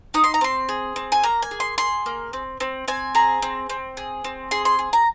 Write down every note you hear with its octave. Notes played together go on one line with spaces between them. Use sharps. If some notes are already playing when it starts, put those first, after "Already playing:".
D#4 D#6
C6
A#5
C4 C6
G#4
C4
G#5
A#3 A#5
G#5
G#4
C6
G#4 C6
A#3
C4
C4
C4 G#5
G#4 A#5
C4
C4
G#4
C4
G#4 C6
C6
G#4
A#5